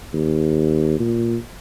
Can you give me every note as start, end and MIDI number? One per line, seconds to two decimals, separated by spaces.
0.14 0.96 39
0.99 1.37 46